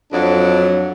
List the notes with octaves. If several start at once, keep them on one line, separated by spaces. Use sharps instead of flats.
F2 F#3 D4